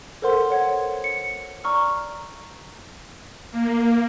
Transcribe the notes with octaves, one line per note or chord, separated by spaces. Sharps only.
A4 A#4 C5 F#5 C6
C#5 F#5 G#6
C#7
D5 A#5 C#6 E6 F6
A#3